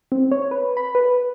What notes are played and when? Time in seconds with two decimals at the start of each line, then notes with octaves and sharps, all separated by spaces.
0.12 C4
0.31 C#5
0.51 B4
0.77 B5
0.95 B4